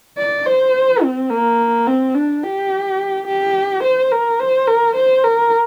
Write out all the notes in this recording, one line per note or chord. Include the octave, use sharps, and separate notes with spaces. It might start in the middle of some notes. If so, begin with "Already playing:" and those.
D5
C5
C4
A#3
C4
D4
G4
G4
C5
A#4
C5
A#4
C5
A#4